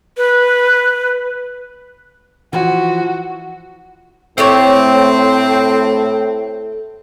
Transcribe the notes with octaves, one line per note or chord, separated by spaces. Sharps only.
B4
E3 F3 F#4
A2 A3 C4 G4 C#5